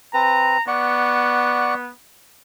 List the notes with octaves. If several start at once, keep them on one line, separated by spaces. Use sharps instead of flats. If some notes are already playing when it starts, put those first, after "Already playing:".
C4 B4 A#5
B3 D5 F#5 C#6